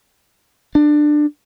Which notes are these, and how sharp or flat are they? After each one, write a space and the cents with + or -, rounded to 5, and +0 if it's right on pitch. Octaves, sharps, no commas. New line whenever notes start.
D4 +20